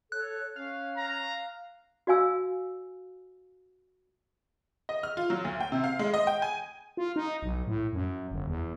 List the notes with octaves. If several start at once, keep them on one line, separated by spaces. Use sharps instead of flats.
A4 C#5 F#6
C#4 F5
A#5
F#4 D5 F5 G#5 E6
D#5
F6
F4
F#3
D2
G5
C3
F5
G#3
D#5
G5
G#5
F4
D#4
B1
A2
F#2
G1
E2